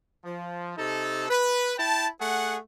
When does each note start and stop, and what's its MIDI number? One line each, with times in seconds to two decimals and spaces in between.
0.24 0.72 53
0.77 1.27 48
0.77 1.27 63
0.77 1.27 69
1.29 1.73 71
1.77 2.06 64
1.77 2.06 79
1.77 2.06 81
2.20 2.57 57
2.20 2.57 68
2.20 2.57 78